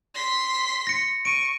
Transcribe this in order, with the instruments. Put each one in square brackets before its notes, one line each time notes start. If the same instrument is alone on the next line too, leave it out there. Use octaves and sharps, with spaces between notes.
[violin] C6 B6
[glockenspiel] A#6 C#7
[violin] C#6 [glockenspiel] D7 D#7